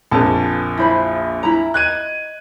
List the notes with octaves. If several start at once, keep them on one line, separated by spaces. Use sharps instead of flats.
A#1 F2 G#4 A#4 C5 A5
E4 C5 B5
E4 A#5
D#5 F#6 G#6 D#7